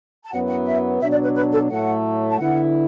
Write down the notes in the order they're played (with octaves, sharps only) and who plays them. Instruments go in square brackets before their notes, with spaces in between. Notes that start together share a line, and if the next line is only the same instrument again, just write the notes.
[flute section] A5
[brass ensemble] F#2 F#3 B3 E4 [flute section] F#5
[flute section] F#5
E5
[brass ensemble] B2 F#3 D4 [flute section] E5
[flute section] D5
B4
B4
A4
[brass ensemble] A2 F#3 A3 [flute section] F#5
[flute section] A5
[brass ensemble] D3 B3 E4 [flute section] F#5